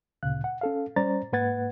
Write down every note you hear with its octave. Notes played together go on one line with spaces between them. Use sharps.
D2 A#2 C#3 F5 F#6
F#5
C#4 A4 F5
G3 C#4 C5 D5 A#5 A6
G#2 A#3 B4 F#5 G#6 A6